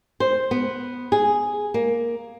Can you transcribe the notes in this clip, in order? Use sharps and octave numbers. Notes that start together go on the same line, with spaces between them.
C5
B3
G#4
A#3